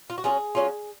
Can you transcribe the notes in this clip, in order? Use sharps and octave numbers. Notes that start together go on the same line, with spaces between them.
F4
F#4
F#3 C#4 F4 G#4
F#3 C#4 F4